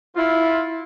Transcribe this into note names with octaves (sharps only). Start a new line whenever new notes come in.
E4 F4